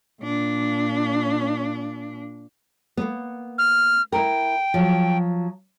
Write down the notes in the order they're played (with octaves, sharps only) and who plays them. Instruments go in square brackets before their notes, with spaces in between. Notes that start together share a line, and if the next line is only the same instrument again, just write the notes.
[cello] A#2 D4
[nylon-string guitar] A#3 B3
[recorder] F6
[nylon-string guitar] E4 A#4 [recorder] G5
[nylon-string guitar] F3 F#3